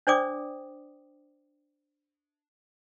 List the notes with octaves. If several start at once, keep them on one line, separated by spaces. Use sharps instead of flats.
D4 C5 D5 G5 D6 D#6